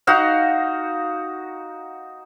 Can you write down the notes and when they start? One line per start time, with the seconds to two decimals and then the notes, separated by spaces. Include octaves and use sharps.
0.07 D#4 F#4 F5